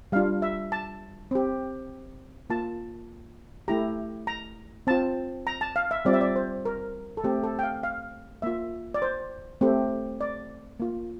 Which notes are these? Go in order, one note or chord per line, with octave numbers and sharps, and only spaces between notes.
G3 D4 F4 F5
E5
A5
C4 G4
A#3 F4 A5
A3 E4 G4 A#5
A#5
C4 F4 A5
A#5
A5
F5
E5
G3 C4 F4 D5
E5
D5
C5
A#4
A4
A3 C4 G4
A4
G5
F5
F5
A#3 F4 E5
D5
C5
A3 C4 G4
D5
A#3 F4